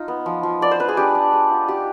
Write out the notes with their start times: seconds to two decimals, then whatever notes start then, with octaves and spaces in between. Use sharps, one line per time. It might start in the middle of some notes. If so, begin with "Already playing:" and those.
Already playing: D#4 F4
0.08 B3
0.26 F3
0.43 F3
0.61 B3 D5
0.71 C5
0.79 D4 B4
0.88 G#4
0.97 D4 G4
1.15 D4
1.33 G#3
1.51 F4
1.68 D#4 G4